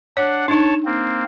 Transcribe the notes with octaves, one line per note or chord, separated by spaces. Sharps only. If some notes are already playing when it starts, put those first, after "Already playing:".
D4 C#5 F#5
D4 D#4 C#5 A5
A#3 C4